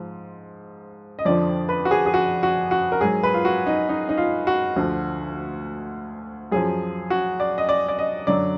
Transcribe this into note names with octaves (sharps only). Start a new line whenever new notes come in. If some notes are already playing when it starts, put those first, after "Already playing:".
Already playing: G#2 F3
D#5
F2 D3 F3 D5
B4
F#4
G#4
G#4
F#4
F#4
F#4
A#4
G#2 F#3 G#4
B4
F4
F#4
D#4
D#4
D#4
F4
F#4
D2 D3 F3
F#2 F3 G#4
F#4
D5
D#5
D5
D5
D#5
F#2 D3 F#3 D5